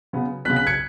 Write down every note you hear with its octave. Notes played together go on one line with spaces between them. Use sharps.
C#3 F#3 B3
C#3 F#3 B3 F#6 B6
F#6 B6
G#6 C#7